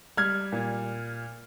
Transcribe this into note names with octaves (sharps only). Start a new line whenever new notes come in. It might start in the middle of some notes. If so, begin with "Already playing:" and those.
G3 F6 G#6
A#2